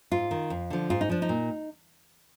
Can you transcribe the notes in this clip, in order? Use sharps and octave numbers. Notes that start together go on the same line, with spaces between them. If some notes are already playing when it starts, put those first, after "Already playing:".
G#2 F4
D#3
F2
D3 F3
G#2 F4
D#4
F3 D4
D#4
A#2